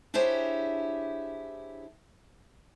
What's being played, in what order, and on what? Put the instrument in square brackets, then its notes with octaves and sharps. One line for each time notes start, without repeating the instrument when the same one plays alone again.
[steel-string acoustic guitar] D4 E4 G4 G#4 C5 C#5